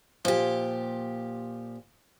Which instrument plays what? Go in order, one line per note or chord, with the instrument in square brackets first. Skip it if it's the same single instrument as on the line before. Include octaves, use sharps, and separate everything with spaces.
[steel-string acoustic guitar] A#2 G4 [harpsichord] F3